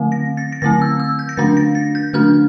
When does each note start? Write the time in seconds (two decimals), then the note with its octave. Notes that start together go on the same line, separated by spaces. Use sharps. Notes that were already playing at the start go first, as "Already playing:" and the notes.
Already playing: D3 A3 C4
0.12 A#6
0.37 A6
0.52 A#6
0.62 D3 A3 C4 A6
0.82 E6
1.00 E6
1.19 G6
1.29 A#6
1.37 D3 A3 D4 A6
1.57 A#6
1.75 A6
1.95 G6
2.13 D3 A3 D4 F6